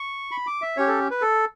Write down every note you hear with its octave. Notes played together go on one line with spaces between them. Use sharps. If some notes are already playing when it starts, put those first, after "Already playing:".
Already playing: C#6
B5
D6
E5
C#4 G4 C#5
A4
B4
A4